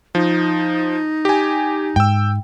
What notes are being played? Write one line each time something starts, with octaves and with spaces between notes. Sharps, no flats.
F3 D#4
G4 G#5
G#2 G5 E6